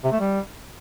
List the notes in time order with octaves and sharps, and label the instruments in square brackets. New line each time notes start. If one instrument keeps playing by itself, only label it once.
[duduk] C3
A3
G3